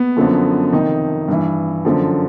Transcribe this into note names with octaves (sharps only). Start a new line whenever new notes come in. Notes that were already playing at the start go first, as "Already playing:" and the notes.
Already playing: B3
F#2 D3 F3
F2 C3 D#3 D#4
G2 E3
F#2 D3 F3